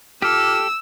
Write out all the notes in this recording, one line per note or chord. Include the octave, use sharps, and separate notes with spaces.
F4 G4 A4 D6 E6 F6